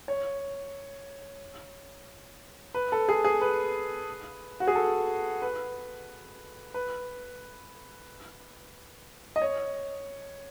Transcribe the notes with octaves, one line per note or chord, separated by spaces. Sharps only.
C#5
B4
A4
G#4
G#4
B4
F#4
G#4
A4
B4
B4
D#5
C#5